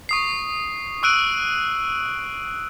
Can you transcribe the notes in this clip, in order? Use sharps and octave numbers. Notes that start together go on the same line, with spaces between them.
C#6 D#6 C7
C#6 E6 F#6 D7 D#7 F#7